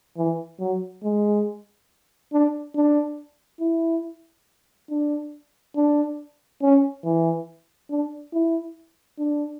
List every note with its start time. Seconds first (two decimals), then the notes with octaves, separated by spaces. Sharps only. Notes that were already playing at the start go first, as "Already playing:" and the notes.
0.17 E3
0.60 F#3
1.03 G#3
2.33 D4
2.75 D4
3.60 E4
4.90 D4
5.76 D4
6.62 C#4
7.04 E3
7.90 D4
8.33 E4
9.18 D4